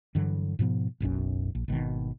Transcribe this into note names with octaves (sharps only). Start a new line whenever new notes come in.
G2 D3 E3 F#3
G#2 B2 F3 B3
F#1 B1 F#2 C#4
A#1
G#1 B2 D3 D#3